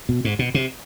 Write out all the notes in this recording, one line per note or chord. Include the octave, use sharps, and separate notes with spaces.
B2
G#2
B2
C3